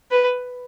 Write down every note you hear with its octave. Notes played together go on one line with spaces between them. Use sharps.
B4